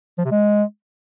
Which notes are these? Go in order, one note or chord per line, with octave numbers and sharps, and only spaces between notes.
F3
C3
G#3